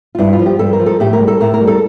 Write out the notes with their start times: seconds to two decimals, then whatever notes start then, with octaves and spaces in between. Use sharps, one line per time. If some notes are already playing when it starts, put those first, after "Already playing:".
0.15 F4
0.18 G2 E4
0.33 F4
0.39 F3
0.46 G4
0.59 G2 A4
0.73 A#4
0.79 F3
0.86 A4
1.00 A2 G4
1.13 A#4
1.21 G3
1.28 A4
1.41 A2 A#4
1.54 A#4
1.61 G3
1.67 A4